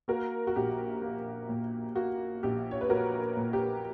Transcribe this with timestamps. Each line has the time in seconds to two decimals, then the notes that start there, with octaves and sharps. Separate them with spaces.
0.08 A#3 F#4 A#4
0.47 F#4
0.56 A#1 G4
1.02 A#3
1.49 A#2
1.95 A#3 F#4
2.43 A#1 G4
2.71 C#5
2.81 B4
2.89 A#2 F#4 A#4
3.37 A#2
3.53 G4